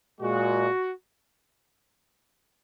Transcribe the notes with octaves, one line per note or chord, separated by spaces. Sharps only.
A#2 G#3 F#4